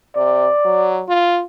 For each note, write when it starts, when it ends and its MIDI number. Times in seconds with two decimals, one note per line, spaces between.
0.16 0.47 48
0.16 1.03 74
0.64 1.03 54
1.09 1.43 65